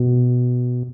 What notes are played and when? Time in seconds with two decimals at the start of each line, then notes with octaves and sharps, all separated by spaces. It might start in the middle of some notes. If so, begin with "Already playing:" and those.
Already playing: B2